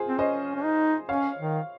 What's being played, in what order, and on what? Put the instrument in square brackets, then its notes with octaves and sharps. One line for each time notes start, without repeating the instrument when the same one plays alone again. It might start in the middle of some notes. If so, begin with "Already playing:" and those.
Already playing: [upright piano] F4 G#4 C5
[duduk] C4
[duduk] C#4 [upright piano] C5 D#5
[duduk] C#4
D#4
[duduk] C#4 [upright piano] C#5 F5
[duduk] D#3